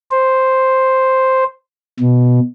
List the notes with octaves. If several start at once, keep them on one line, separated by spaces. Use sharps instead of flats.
C5
B2